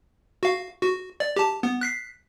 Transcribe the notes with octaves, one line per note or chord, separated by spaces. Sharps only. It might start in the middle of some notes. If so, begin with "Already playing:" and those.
F#4 F5
F#4
D5
G4 A5
B3
F#6 B6 C7